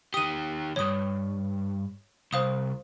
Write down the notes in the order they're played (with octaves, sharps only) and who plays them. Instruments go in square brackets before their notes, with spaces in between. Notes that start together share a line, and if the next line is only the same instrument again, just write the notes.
[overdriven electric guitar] D#3 G4 [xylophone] D#6 D#7
[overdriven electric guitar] C2 G2 [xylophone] C#5 D#6
[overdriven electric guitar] C2 [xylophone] C5 F5 D#6